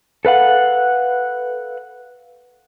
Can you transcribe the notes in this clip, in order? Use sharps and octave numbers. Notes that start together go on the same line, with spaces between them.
A4 B4 F5 F#5